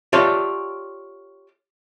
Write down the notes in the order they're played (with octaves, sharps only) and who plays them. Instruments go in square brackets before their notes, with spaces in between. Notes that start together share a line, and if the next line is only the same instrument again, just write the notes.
[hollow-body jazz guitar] F4 G4 A4 C#5 D5 E5